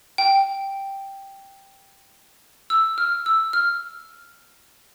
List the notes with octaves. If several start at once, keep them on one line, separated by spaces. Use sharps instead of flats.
G5
E6
F6
E6
F6